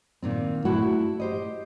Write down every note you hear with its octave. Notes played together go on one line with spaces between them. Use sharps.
A#2 D#3 C4
A3 E4 F#4 F#5
G4 C5 D#5